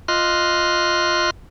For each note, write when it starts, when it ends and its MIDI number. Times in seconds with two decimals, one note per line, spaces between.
0.08 1.30 65
0.08 1.30 75
0.08 1.30 84
0.08 1.30 89
0.08 1.30 90